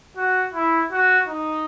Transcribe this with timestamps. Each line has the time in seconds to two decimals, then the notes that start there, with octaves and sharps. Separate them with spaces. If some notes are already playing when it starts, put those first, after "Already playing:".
0.17 F#4
0.54 E4
0.92 F#4
1.28 D#4